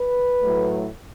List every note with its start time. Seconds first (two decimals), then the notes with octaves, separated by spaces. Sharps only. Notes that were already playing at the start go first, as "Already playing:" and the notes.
Already playing: B4
0.40 A2 F#3 A3